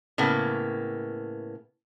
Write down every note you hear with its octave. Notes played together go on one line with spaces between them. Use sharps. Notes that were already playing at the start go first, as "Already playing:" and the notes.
A2 C#3 A#3 B3